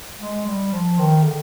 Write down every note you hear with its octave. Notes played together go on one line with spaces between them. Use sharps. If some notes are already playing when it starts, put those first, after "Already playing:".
G#3
G3
F3
D#3
D3